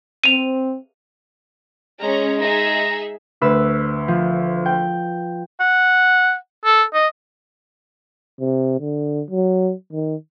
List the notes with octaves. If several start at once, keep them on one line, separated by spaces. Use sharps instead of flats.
C4 D#7 F7
G#3 C#4 A#5
D#4 G#4 E5 A#5
D2 B4 E6
F3
G5
F#5
A4
D#5
C3
D3
F#3
D#3